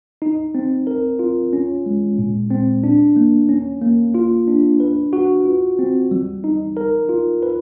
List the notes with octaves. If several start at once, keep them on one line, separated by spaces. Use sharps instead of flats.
D#4
C4
A#4
F4
C#4
G#3
A#2
C4
D4
A#3
C#4
A#3
F4
D4
B4
F#4
F4
C4
G3
D#4
A#4
F4
B4